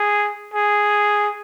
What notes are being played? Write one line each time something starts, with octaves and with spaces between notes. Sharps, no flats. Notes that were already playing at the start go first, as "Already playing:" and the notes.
Already playing: G#4
G#4